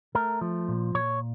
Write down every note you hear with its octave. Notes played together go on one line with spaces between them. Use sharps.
A3 A#4
F3
A#2
A#2 C#5